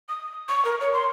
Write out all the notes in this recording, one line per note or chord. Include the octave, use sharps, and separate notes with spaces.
D#6
C#6
A#4
C#5
C6